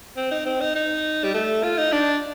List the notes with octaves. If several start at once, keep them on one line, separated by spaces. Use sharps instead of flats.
C4
D#4
C4
D#4
D#4
G3
A3
F4
D#4
D4